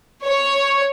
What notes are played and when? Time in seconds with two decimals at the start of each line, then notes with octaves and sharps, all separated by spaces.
0.25 C#5